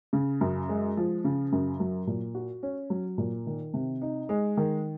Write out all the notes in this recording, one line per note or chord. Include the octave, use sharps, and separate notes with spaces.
C#3
F#2
G#3
F3
C#3
F#2
F#3
A#2
F#4
C#4
F#3
A#2
D#3
C3
D#4
G#3
D#3